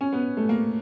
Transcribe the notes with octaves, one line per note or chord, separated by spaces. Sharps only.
C#4
B3
A3
A#3